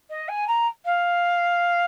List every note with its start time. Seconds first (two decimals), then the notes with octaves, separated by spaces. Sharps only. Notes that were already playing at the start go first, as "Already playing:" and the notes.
0.10 D#5
0.28 G#5
0.47 A#5
0.85 F5